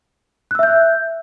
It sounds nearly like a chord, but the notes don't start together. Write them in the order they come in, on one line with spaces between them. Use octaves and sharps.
F#6 E6 E5 G6